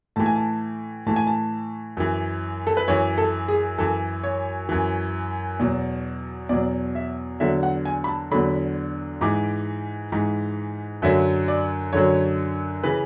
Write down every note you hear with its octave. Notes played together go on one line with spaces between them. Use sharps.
A2 E3 A5
G#5
A5
A2 E3 A5
G#5
A5
F#2 E3
A4
B4
F#2 E3 C#5
A4
G#4
F#2 E3 A4
C#5
F#2 E3
E2 B2 F#3
E2 B2 F#3 D5
E5
E2 D3 F#3 E5
F#5
G#5
B5
A5
E2 D3 F#3 B5
G#2 E3 D6
G#2 E3
F#2 D3 F#3 E5
D5
F#2 D3 F#3 C#5
C#3 E3 B4